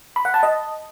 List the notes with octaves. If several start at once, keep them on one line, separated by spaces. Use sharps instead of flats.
B5
F#5
A5
D#5